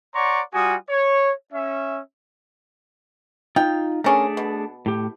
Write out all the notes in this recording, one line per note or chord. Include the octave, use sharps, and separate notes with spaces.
C#5 D5 F#5 A#5 C6 C#6
G3 F4 F#4 G#5 D#6
C#5
C#4 E5
D#4 F4 G5
A3 C#4 D4 G#4 A#4
B2
A2 G4